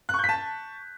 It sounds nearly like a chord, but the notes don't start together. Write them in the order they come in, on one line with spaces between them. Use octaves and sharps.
F#6 C#6 G6 B6 A5